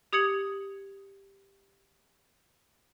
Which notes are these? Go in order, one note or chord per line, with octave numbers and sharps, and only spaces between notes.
G4 D#6 G#6 C#7 F#7